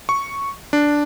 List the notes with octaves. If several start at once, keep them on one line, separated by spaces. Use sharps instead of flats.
C#6
D4